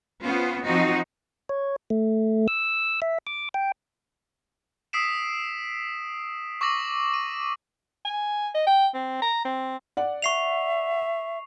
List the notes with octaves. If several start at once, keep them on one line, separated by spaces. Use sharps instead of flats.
B3 C#4 F4 C5
F3 C4 D#4 F#4
C#5
A3
E6
E5
D6
G5
D#6 E6 B6 C7 D7 E7
C#6 D6 E6 A#6 F#7
D#7
G#5
D#5
G5
C4
A#5
C4
D5 F#5
E5 C#6 C7 F7